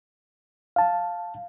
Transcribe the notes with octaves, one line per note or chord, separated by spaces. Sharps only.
F5 A5